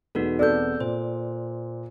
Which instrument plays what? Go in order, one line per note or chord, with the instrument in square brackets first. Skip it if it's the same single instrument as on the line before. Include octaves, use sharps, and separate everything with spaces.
[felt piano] E1 B3 [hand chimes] D#4 F#4 A4
[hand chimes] C4 E6 G6 [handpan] A4 D5
[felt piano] A#2 [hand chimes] C5